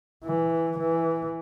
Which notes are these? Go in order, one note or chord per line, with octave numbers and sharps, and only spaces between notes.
E3
E3